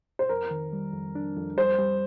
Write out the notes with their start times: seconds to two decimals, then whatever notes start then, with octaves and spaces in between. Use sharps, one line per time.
0.19 C5
0.29 F2 A#4
0.51 D#3
0.73 G3
0.93 F2
1.15 D4
1.37 F2
1.58 G3 C5
1.79 G3